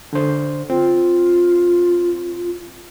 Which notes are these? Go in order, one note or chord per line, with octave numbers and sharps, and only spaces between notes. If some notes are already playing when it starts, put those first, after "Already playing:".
D3 C5
C4 F4